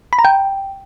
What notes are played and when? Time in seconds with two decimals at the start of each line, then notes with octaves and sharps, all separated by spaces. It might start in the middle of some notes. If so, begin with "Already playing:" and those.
0.13 B5
0.19 A#5
0.25 G5